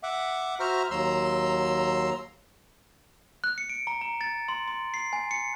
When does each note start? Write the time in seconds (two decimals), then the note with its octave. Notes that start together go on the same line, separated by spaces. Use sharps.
0.03 E5 F#5 D6
0.60 F#4 C5 E5 A#5 F6
0.91 D#2 F#3 A#5 C6 E6
3.44 F#6
3.58 C#7
3.69 D7
3.87 A#5
4.01 A#5
4.21 A6
4.48 C6
4.68 C6
4.94 C7
5.13 G#5
5.31 C#7